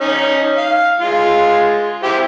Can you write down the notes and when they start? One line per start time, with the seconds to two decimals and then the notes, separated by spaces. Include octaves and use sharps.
0.01 C#4 D#4
0.58 F5
1.00 G#3 F4
2.03 E4 G4 C5